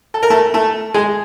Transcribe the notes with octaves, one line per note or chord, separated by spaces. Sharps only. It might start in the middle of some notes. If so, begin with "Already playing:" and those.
A4
A#4
A3 A4
A3 A4
G#3 G#4